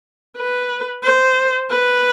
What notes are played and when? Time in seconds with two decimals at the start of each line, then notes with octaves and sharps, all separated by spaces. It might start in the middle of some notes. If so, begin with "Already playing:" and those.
0.37 B4
1.03 C5
1.70 B4